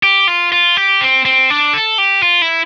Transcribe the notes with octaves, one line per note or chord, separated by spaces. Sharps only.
G4
F4
F4
G4
C4
C4
D4
A4
G4
F4
E4